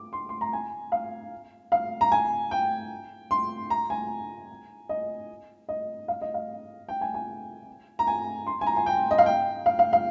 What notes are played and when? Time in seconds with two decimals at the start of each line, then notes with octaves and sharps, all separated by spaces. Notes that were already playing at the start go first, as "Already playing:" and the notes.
Already playing: D6
0.13 C6
0.29 C6
0.41 A#5
0.53 G#5
0.92 F5
1.72 F5
2.01 A#5
2.12 G#5
2.51 G5
3.31 C6
3.70 A#5
3.90 G#5
4.89 D#5
5.69 D#5
6.08 F5
6.22 D#5
6.34 F5
6.89 G5
7.01 G#5
7.14 G#5
7.99 A#5
8.07 G#5
8.47 C6
8.61 G#5
8.67 A#5
8.77 G#5
8.86 G5
9.11 D#5
9.18 F5
9.26 G5
9.66 F5
9.79 F5
9.93 F5